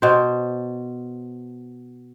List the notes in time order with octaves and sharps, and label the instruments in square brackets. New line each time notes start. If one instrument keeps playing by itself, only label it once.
[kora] B2 C5